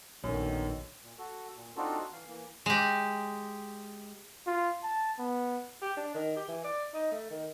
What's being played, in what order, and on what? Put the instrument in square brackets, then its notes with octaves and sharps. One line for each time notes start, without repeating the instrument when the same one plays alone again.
[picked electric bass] A#1 [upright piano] F#2 [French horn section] B2 D3 D#3 [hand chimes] C#5
[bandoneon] A#2
F#4 A4
A#2
C4 D4 D#4 F4 F#4 A4
E3 F5
E3 A#3
[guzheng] G#3 G4
[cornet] F4
A5
B3
[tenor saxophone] G4
D4
D#3
G4
E3
D5
D#4
A3
D#3